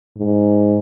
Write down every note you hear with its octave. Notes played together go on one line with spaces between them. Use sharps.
G#2